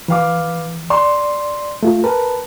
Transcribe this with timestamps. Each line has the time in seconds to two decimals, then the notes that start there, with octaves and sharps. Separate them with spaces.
0.08 E3 B4 F5 D6
0.90 D5 C6
1.83 A3 F4
2.04 A#4 B4 A5